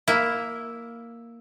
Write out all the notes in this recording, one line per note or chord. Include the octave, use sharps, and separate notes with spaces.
A#3 E4